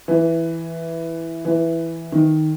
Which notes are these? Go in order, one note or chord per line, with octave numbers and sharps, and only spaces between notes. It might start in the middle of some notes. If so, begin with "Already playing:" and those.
E3
E3
D#3